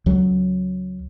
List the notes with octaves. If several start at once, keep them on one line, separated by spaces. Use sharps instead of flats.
C#2 F#3